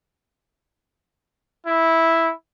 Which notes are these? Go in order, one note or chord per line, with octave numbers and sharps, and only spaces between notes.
E4